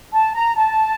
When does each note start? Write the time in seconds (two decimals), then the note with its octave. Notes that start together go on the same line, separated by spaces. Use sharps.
0.13 A5
0.34 A#5
0.55 A5